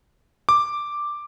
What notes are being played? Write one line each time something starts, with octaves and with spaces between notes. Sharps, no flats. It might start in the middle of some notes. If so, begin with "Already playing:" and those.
D6